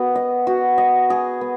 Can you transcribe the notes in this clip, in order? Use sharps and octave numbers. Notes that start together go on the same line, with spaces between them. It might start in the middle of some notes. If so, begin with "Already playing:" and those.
Already playing: B3 F#4
D#5
F#4
D#5
G#4
B3